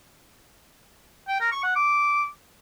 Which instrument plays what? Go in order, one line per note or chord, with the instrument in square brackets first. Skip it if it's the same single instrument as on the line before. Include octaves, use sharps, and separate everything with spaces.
[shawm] G5
A#4
C#6
F#5
D6